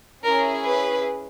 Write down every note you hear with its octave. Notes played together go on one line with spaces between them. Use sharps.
C#4 E4 G#4 A#4
B4